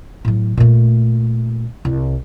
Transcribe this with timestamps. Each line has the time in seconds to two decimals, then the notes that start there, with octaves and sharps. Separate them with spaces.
0.25 A2 F#3
0.57 A#2 A3
1.85 C2